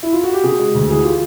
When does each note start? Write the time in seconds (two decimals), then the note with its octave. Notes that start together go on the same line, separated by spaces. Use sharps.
0.03 E4
0.13 F4
0.23 F#4
0.33 G4
0.43 C#3 F#4 G#4
0.59 G#3
0.75 D2
0.89 E3 F#4 G#4
1.05 F4 G4